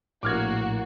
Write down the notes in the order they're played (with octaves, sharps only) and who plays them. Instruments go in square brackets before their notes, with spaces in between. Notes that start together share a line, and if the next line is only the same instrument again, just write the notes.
[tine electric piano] A#1 A2 [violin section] A#3 F#4 [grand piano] D6 F6 G#6